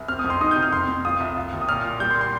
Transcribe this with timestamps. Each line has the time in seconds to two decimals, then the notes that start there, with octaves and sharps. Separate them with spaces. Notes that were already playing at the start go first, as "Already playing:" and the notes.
Already playing: C2
0.08 C4 F6
0.19 D#6
0.24 F2
0.30 C6
0.41 D#4 D#6
0.51 C3 G6
0.63 F6
0.72 F2 C6
0.88 F2
1.05 F4 D#6
1.20 C2
1.36 F4
1.52 D#2
1.61 D#6
1.69 A#2 F6
1.84 A#2
2.00 G3 G6
2.11 C6
2.21 C6